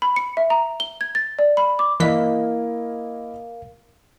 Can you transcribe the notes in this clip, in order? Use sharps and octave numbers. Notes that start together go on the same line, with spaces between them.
B5
C#7
E5
A#5
G7
G#6
A6
D5
B5
D6
E3 A#3 E4 A#4 D#5 F5 B6